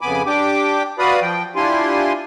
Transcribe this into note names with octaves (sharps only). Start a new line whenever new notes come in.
F2 C#3 B3 G#5 B5 D6
D4 G4 G5 D6
F#4 B4 D5 F5 B5 D#6
F3 G5
D4 E4 F4 G4 G#5 C6